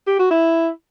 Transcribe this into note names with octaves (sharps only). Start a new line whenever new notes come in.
G4
F#4
E4